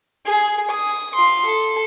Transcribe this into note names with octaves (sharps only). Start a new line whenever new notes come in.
G#4
D#6
F4 C6
A4